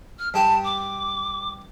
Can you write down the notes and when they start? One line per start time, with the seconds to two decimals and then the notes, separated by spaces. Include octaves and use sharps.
0.19 F6
0.34 G2 G4 G5 A5
0.65 D6